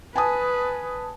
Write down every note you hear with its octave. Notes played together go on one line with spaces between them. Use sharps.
B4 G#5 A5 D#6